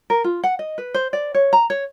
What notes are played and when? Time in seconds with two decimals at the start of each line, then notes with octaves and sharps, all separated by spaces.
0.10 A#4
0.24 F4
0.44 F#5
0.59 D#5
0.78 B4
0.94 C5
1.13 D5
1.34 C#5
1.53 A#5
1.70 C#5